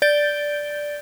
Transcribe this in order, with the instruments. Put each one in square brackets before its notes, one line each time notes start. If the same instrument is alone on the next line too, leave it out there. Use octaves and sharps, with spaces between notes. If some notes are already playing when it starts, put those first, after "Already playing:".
[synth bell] D5 G6 A6 D7 G7